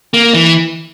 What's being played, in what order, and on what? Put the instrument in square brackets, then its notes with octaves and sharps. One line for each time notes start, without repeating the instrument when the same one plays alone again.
[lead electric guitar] A#3
E3